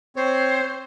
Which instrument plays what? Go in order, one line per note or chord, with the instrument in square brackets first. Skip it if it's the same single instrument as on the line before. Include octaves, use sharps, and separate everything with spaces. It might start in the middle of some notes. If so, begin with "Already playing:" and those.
[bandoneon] C4 C#5 [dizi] C5